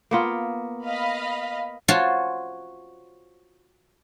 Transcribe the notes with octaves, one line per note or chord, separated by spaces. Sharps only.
A#3 B3 F4
D#5 F5 B5
F4 F#4 C5 C#5 A5 C6